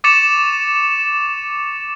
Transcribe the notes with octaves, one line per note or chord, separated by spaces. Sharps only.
C#6 D6 A6 C#7 E7 F7